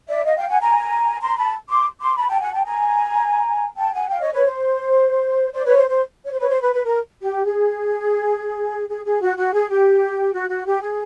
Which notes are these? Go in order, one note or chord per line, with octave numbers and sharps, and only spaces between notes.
D5 E5
D#5 F5
F5 G5
F#5 G#5
G#5 A#5
A#5 C6
A5 B5
C6 D6
C6 D6
A5 B5
G5 A5
F#5 G#5
G5 A5
G#5 A#5
G5 A5
F#5 G#5
F5 G5
C#5 D#5
B4 C#5
C5
C5 D5
B4 C#5
C5
C5
C#5
C5
B4 C#5
C5
B4
B4
A#4
G4
G#4
G#4
G#4
F#4
F#4
G#4
G4
F#4
F#4
G4
G#4